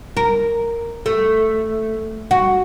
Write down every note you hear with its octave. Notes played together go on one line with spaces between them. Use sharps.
A#4
A3
F#4